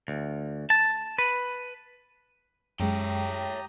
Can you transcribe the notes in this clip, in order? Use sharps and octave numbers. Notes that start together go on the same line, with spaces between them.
D2
A5
B4
F#2 G#3 G4 C#5 E5 G5 A#5 D#6